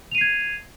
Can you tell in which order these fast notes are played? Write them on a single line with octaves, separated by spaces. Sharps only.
F7 D#7 C7 G#6